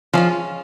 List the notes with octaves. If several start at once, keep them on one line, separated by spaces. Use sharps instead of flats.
F3 G#3 C#4 F4